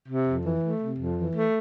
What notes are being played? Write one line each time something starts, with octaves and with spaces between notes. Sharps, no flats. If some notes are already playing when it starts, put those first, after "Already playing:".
C3
F2
E3
A3
C3
F2
E3
A3